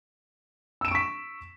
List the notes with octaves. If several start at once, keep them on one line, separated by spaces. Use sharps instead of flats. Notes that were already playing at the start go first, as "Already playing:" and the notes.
C#6 E6 B6 D7 E7